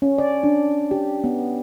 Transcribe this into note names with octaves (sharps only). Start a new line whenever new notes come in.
C#4
D5
D4
G4
B3